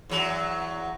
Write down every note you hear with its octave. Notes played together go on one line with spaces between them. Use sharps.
E2 F#3